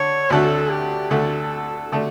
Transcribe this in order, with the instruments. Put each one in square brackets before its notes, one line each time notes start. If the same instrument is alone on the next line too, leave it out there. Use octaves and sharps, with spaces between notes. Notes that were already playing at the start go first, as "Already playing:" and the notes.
Already playing: [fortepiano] D3 [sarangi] C#5
[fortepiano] D2 D3 A3 [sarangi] A4
[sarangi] G4
[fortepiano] D2 D3 A3 [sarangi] A4
[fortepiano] D3 A3